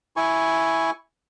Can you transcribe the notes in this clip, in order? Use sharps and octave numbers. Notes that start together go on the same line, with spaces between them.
E4 G#5 C#6